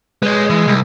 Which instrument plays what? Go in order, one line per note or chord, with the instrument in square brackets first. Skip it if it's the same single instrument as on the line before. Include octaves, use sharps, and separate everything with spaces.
[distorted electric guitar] G#3 [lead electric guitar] B4 C#5
[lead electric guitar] E3
C2